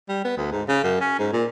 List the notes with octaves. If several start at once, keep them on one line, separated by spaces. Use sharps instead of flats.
G3
B3
D2
G#2
C#3
F#2
C#4
G#2
A#2